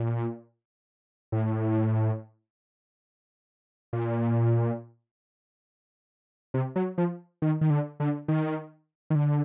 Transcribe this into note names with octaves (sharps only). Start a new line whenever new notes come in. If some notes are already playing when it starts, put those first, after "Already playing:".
Already playing: A#2
A2
A#2
C3
F#3
F3
D#3
D#3
D3
D3
D#3
D#3
D3